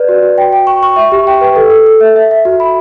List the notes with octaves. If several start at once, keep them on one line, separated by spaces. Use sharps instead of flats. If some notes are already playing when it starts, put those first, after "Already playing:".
Already playing: B4 D5
F#4
F#4
G5
G5
C#6
C#6
E5
G4
G5
B4
A4
A4
A4
E5
E5
E5
F#4
B5